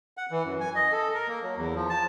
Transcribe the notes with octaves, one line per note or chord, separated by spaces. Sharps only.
F#5
E3
F#2
G#5
D#5
A4
A#4
A#3
F#3
E2
F3
A5